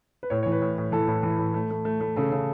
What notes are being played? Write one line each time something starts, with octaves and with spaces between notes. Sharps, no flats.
B4
A2 C#5
E3 C#5
B4
A2
A2
E3 A4
A2
E3
A2
A3
A3
A3
A3
C#3 A4
C#3